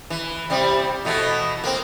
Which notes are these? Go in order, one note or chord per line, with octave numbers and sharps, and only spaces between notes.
E3
C3 G3 C4
B2 E3 A3
A#3 C4